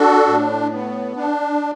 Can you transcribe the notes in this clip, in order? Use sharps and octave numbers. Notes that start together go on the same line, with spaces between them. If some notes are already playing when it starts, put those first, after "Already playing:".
Already playing: D4 F#4 A4
A2
B3
D4